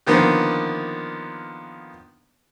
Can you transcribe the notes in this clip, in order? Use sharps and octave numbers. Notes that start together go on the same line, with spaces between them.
D3 D#3 F3 A#3 B3